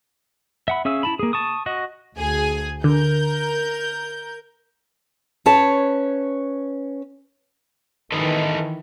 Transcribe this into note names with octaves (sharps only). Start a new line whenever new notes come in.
E5 F#5 B5
C#4 G#4 E5 F5 E6
E4 A5 B5
A#3 G#4
A5 C#6 D#6
F#4 D#5
D2 G#4 G#5
D3 A#4 G6
C#4 B4 C#5 A5
D#3 E3 A4 B4 D#5